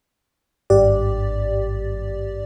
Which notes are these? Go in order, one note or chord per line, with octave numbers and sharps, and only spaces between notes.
G#1 G2 G4 D5